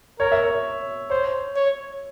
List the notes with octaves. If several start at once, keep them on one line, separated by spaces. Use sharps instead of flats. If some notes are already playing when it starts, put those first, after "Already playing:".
A#4 C#5
E5
C#5
C5 C#5
C#5